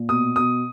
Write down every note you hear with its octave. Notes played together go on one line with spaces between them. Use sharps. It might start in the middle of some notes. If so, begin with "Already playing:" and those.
Already playing: A#2
B2 D#6
B2 D#6